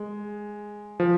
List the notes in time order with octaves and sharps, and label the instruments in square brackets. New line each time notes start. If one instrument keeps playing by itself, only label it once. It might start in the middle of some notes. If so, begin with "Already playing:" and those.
Already playing: [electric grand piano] G#3
F3